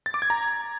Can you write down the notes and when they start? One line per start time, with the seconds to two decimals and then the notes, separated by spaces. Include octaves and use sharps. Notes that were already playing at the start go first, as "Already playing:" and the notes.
0.06 A6
0.14 D6
0.22 G#6
0.30 A#5